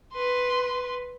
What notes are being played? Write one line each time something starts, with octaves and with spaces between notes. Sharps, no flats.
B4 C6